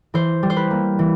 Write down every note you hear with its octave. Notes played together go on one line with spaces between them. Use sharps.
E3 C5
G3
C5
B4
A#3
E3